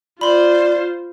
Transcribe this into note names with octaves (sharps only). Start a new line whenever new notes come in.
F4 C5 D5 B5 C6